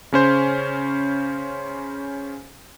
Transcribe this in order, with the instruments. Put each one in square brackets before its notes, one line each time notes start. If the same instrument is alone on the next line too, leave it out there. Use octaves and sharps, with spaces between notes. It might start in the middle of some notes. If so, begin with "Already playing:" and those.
[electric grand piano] C#3 C#4 C5